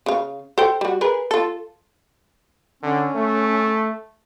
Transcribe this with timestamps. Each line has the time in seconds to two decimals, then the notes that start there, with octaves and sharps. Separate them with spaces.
0.06 C#3 F5
0.58 A4 C5 G5
0.81 G3 F#4
1.01 G#4 A#4 B4
1.31 F4 A4
2.83 D3 C#4
3.15 A3